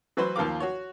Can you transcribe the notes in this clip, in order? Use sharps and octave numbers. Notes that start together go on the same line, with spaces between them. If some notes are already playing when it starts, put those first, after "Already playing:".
E3 F#3 F#4 B4 C5
D#2 F3 F4 A#4 F5 D6
F#4 C#5